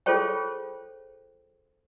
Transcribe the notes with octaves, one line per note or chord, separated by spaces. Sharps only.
F4 G#4 A4 C5 C#5 G5